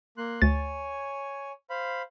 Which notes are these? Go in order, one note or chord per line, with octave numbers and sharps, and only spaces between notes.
A#3 C6 F#6
D2 C#5 G#5 A6
C5 F5 B5